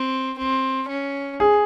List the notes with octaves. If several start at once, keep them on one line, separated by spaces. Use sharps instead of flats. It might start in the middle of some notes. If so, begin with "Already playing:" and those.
Already playing: C4
C4
C#4
G#4